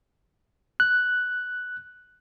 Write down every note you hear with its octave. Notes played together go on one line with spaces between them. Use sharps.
F#6